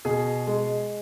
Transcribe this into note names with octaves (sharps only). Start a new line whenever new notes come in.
B2 G#4
G#3